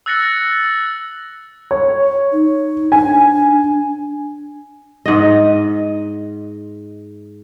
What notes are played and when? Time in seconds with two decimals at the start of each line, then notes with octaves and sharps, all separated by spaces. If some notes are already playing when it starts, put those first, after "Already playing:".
0.06 E6 F#6 A6 A#6 C#7 F#7
1.71 C#5
2.32 D#4
2.92 D4 G#5
5.06 G#2 D#5